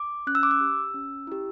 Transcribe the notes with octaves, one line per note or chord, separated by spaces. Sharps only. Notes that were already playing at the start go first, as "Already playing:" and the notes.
Already playing: D6
C#4 F#6
E6
D6
E6
G4
C#4
E4 G4